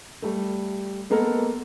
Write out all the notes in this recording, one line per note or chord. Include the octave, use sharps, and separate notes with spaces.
G3 A3
G#3 A#3 B3 A4 A#4